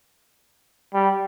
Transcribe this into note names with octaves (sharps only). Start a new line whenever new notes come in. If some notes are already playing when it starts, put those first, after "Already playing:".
G3